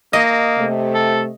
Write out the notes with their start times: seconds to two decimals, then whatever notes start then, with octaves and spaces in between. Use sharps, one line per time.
0.13 A#3 D#5
0.57 C3 A3
0.94 A4